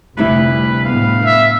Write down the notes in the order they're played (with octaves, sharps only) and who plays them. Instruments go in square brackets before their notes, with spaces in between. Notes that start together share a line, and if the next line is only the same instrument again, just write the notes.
[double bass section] F1 [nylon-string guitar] D2 G3 E4 [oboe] B4
[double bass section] A2 B3 [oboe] F5
[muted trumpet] E5